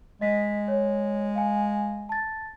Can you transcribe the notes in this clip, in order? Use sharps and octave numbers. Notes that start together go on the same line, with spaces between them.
G#3 D#5 B6
C#5
F5 G#5
A5 A6